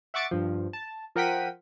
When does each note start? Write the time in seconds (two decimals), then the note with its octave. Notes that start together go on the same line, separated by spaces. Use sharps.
0.14 E5 F#5 C#6 D6 A6 C#7
0.31 G2 F3
0.73 A5
1.15 F3 A#4 F#5 G5 B6 D#7